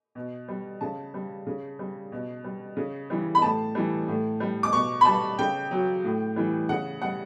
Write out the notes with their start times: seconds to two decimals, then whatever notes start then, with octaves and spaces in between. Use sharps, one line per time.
0.15 B2
0.48 G3
0.81 C#3 A5
1.14 G3
1.47 C#3
1.79 G3
2.12 B2
2.44 G3
2.77 C#3
3.10 E3 G3
3.35 B5
3.42 A2 A5
3.75 E3 G3
4.08 A2
4.40 G3
4.63 D6
4.72 B2 C#6
5.01 B5
5.05 G3 A5
5.39 C#3 G5
5.71 F#3
6.04 A2
6.36 E3 G3
6.69 C#3 F#5
7.01 G3 F#5